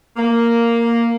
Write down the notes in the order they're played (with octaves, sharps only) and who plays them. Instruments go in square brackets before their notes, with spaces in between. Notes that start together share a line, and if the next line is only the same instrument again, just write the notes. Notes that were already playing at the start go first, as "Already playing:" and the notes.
[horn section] A#3